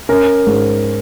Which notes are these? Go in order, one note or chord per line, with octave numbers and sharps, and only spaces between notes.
C#4 A#4
G#2